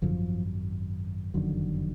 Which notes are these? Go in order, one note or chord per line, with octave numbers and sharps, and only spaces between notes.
G#1 F#2 D3 F3
F#1 F2 D3 D#3 F#3